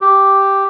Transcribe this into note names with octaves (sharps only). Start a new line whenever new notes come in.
G4